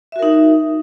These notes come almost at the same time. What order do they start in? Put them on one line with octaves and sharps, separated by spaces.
E5 F#4 A#4 D#4